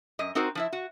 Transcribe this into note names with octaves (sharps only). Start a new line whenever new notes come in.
F#2 D#5
C4 D#4 F#4 A#4 C5
F3 E4 E5
F#4